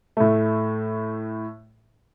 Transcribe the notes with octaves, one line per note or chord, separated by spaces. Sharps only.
A2 A3